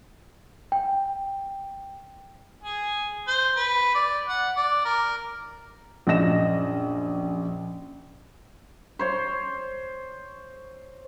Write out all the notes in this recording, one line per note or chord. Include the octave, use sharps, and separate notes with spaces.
G5
G#4
C5
B4
D5
F#5
D5
A#4
A#1 F#2 D#5 A#6 E7
C5 C#5 C6